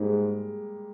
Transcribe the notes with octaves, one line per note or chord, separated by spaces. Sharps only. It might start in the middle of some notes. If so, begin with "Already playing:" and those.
Already playing: G#2 G3 A#3
G#3